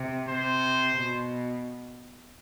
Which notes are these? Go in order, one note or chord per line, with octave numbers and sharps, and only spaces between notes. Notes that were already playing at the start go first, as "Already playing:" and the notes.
Already playing: C3
C3 C5
B2